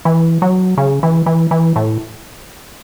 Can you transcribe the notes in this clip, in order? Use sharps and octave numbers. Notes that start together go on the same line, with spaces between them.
E3
F#3
C#3
E3
E3
E3
A2